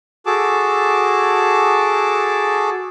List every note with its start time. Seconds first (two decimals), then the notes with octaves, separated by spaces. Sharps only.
0.26 F#4 G#4 A4 A5 D6